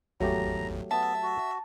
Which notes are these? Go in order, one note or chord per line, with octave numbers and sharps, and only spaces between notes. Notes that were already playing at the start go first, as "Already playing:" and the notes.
G#1 E2 F#3 A3 G4 A#5
B3 E5 A5
F#4